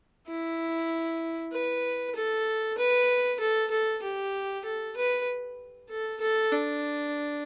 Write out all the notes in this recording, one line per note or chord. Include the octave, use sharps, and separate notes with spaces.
E4
B4
A4
B4
A4
A4
G4
A4
B4
A4
A4
D4